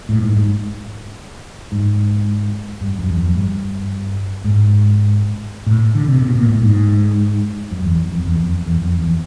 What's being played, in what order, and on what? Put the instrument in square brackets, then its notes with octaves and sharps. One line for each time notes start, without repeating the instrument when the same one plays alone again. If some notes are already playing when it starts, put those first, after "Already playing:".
[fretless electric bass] A2
G#2
G#2
G#2
G2
F#2
E2
F2
G2
G#2
A2
D3
C3
B2
A#2
A2
G#2
F#2
E2
F2
E2
F2
E2
F2
E2